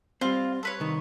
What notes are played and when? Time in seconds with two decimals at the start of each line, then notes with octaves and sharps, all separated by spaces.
0.21 G3 C4 F4
0.63 A4 B4 C#5
0.80 C2 D#3